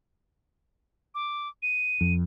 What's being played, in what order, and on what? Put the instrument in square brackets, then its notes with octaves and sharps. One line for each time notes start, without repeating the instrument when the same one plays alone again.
[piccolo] D6
D#7
[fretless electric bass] F2